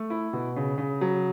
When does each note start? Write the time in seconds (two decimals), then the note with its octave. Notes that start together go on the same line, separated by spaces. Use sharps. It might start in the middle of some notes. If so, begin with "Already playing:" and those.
Already playing: A3
0.10 E4
0.33 B2
0.56 C#3
0.78 C#3
1.01 F#3